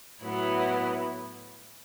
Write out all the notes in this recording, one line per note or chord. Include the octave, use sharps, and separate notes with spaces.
A2 F#3 B3 E4